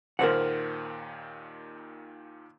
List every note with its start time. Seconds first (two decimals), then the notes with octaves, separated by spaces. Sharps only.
0.19 D#2 A#2 D#3 A#4 C5 F#5